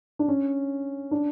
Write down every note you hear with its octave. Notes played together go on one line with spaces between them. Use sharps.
D4
C#4
D4